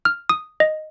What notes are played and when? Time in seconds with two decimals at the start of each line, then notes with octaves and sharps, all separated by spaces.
0.05 F6
0.29 D#6
0.60 D#5